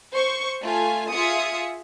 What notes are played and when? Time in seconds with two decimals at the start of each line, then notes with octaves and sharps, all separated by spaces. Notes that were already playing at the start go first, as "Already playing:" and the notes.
0.11 C5 C#6
0.62 A3 F4 G#5
1.11 F4 G#4 E5 D#6 C#7